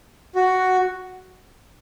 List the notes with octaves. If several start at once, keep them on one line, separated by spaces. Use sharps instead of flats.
F#4